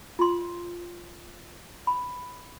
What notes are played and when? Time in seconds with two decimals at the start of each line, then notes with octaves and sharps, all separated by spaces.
0.19 F4 C6
1.87 B5